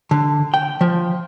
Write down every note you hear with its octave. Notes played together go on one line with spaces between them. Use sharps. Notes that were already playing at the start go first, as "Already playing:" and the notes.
D3
G5
F3